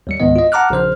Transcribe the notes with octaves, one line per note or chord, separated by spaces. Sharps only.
D#2 G3 C#7
C#2 G#2 D#3 B3 D#5
F4 D#5
F#5 A5 A#5 D6 F6 F#6
A#1 C#3 C5 F6